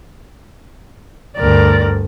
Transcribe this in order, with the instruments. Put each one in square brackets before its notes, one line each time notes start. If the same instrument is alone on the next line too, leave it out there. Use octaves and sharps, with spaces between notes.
[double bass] D2 G2 [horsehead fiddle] A#4 D5